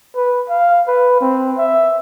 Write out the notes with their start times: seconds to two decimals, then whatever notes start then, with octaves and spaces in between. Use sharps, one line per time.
0.16 B4
0.49 F5
0.87 B4
1.21 C4
1.58 E5